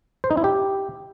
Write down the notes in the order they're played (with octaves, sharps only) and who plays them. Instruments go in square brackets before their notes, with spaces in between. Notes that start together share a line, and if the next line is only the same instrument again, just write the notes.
[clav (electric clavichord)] C5
D#4
E4
G4